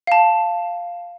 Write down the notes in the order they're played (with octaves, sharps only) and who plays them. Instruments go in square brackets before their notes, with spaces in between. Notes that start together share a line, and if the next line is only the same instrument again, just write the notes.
[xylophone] F5 A5